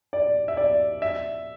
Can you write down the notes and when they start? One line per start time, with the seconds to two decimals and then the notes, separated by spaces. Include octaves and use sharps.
0.13 D5
0.48 E5
0.57 D5
1.02 E5